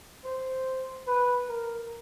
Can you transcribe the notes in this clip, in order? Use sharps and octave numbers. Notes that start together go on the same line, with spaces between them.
C5
B4
A#4